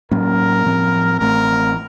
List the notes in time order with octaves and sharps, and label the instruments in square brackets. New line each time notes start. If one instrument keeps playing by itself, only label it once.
[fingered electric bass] A2 F#3 A#3 C#4 [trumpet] A#4
[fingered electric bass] A2 F3 C4
[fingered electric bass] A1 A2 A3 C4 [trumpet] A#4